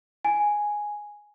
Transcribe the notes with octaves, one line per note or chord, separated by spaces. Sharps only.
G#5